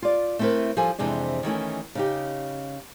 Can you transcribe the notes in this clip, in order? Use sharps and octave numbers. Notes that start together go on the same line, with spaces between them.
F4 D5
A3 B3 C4 E4 A#4 B4
F3 G3 A4 G#5
F2 C3 E3 G#3 D4
D#3 E3 A3 C#4
C#3 D#4 G4